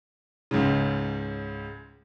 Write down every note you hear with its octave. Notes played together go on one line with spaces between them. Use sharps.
C#2 G#2 C#3